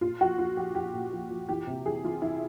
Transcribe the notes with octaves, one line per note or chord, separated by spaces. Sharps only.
A#2 F4
F3 F#4
F3 F4
F3 G4
F3 G4
A#2
F3
F3
E3 G4
C3
E3 G#4
E3 F4
E3 E4